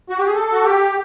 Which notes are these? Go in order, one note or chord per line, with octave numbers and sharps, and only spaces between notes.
F#4
G4
G#4
A4
F#4
G4